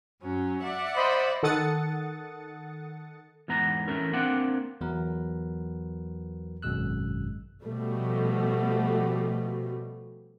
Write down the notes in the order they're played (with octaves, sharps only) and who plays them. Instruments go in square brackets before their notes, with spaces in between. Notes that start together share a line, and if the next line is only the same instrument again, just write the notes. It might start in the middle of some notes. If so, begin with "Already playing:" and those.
[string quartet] F#2 F#3 C#4
D5 E5 F#5
[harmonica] C5 D#5 B5
[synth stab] D#3 A4 F#5 D#6 A6 C#7
[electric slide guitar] E2 G#2 B3 A#5
E3 A3 C#4 E4 A#4
A#3 C4 D4 D5 F#5
[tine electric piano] E2 F#3 B3 A#4 B4
G#1 F#2 B2 G#3 E6 F#6
[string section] B2 F3 G3 A3